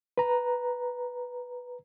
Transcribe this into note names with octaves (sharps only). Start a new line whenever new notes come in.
B4 A#5